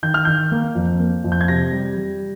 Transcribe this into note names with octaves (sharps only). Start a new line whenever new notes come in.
D#3 G6
F6
D#3 G6
A#3
F2
A#3
F2
G6
G#6
C3 A#6
G3
G3